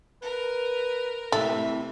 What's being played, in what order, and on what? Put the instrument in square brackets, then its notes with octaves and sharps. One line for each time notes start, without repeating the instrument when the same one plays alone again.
[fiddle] A#4 [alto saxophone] B4
[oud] C3 E3 A3 [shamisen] A4 [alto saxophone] E5